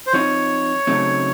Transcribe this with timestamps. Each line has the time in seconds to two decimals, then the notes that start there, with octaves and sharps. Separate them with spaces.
0.07 C5
0.13 F3 C4 D#4 C#5
0.87 C#3 F#3 A3 C4 D#4